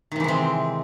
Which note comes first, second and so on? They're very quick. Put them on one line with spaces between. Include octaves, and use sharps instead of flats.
D#3 C3 E3 G#3 C4